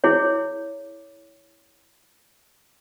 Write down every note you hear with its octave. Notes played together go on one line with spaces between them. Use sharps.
E4 G#4 C#5